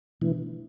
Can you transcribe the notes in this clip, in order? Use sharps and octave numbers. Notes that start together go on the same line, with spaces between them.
B2 E3 A3 D4